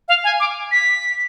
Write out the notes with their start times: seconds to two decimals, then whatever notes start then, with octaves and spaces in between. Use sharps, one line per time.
0.08 F5
0.24 G#5
0.40 D6
0.71 B6